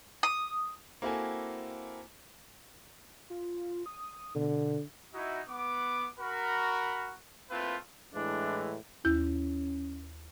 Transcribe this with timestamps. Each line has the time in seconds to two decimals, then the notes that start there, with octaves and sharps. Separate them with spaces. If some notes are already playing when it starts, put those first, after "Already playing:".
0.23 D#6
1.02 A#3 C4 E4 F#4 A4 G#5
3.30 F4
3.86 D#6
4.35 B2 D3
5.14 D#4 E4 F#4
5.48 B3 D6
6.18 F#4 A#4 B5
7.50 A3 A#3 C4 E4 F4 B4
8.14 A2 E3 G#3 D4
9.05 D#2 C#4 E4 G6